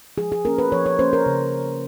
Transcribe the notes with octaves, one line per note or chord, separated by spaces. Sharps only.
F3 G#4
G#4
A#3 C#4 A#4
B4
F3 C#5
C#5
A#3 C#4 C5
A#4
C#3